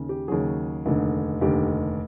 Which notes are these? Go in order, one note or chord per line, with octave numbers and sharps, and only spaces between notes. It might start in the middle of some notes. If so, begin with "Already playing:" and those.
Already playing: D#2 C#3
G4
D#2 C#3 F#3 G#4
F1 D#2 D3
F1 D#2 D3 G4